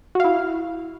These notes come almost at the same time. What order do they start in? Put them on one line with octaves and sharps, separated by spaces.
F#4 F5 E4